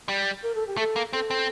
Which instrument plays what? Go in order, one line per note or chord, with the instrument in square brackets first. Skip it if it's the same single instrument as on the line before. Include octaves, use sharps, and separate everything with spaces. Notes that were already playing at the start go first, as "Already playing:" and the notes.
[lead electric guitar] G3
[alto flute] A#4
A4
G4
[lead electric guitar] A3 [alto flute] A4
[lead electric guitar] A#3
[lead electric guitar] C4 [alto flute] A4
[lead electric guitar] C4